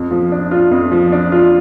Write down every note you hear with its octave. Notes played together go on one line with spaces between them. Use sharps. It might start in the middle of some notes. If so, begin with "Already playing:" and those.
Already playing: F2
F3
D4
F4
F2
F3
D4
F4